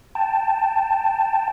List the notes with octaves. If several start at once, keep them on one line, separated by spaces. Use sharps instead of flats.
G5 A5